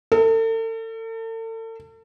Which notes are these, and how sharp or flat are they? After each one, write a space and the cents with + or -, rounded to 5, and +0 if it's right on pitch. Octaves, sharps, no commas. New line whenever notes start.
A4 +40